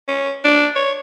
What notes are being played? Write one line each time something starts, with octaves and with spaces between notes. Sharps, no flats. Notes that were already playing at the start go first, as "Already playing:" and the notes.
C#4
D4
C#5